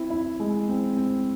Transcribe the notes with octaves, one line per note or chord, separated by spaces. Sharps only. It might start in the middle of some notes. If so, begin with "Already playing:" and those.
Already playing: C4 E4
E4
G#3
C4
C4